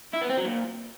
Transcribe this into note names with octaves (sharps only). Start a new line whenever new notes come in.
E4
B3
C4
F#3
A#2